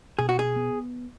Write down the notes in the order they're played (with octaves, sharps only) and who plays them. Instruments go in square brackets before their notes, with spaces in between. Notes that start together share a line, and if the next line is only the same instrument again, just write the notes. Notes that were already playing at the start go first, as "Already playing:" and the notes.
[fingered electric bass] B2 [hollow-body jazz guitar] G#4
[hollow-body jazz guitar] F#4
G#4
[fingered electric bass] B3